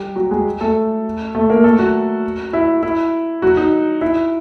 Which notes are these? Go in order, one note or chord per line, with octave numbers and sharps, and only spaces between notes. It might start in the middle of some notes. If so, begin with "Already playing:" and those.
Already playing: G3 G4
F#3 F#4
G#3 G#4
A3 A4
A3 A4
A#3 A#4
A3 A4
F#3 F#4
E4
E4
F#3 F#4
D#4
E4